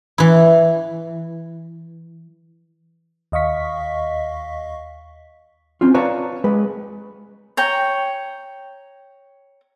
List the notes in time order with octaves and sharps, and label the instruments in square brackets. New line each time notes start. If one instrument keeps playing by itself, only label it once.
[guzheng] E3 E4
[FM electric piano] D#2 D#5 F5 C#6 B6
[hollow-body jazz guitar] C4 C#4 F4
B4 C#5 D5 F5 A5 A#5
G#3 B4
[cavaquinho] C#5 G5 A#5